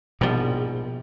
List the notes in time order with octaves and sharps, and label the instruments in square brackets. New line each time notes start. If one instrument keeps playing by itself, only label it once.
[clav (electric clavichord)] A#1 G#2 G3 [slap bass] B2 F3